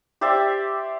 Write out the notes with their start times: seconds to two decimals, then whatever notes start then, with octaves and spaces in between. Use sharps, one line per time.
0.21 G4 C5 D5 E5